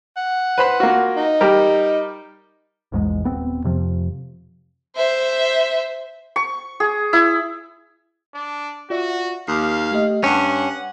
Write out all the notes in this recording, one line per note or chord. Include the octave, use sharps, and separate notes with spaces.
F#5
B4 C5 B5
A#3 F4 F#4
D#4
G3 G4 A#4
A#1 E2 G#2 G#3
D#1 B3 C4
F2 C3 F3
C5 E5
C#6
G#4
E4
D4
F4 F#4 D5 E5
D#2 F5 D6 F#6 C7
A3 G4 D#5
G2 C#4 F#5 A5